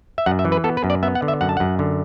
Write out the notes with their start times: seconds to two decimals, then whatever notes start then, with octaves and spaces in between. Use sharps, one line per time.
0.18 E5
0.26 F#2 F#5
0.39 E5
0.45 E3
0.52 B4
0.64 B3 A4
0.77 B4
0.84 F#2
0.90 D5
1.03 B3 E5
1.15 F#5
1.22 D3
1.28 E5
1.41 F#2 F#5
1.49 A5
1.57 F#2 F#5
1.79 D3